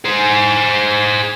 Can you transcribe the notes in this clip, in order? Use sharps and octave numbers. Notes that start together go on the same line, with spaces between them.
G#4 C5